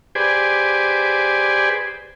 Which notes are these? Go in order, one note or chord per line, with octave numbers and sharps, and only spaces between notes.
G4 G#4 B4 C5 D5 G#5